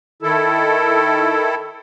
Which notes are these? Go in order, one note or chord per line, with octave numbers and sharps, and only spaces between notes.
D#3 E4 A4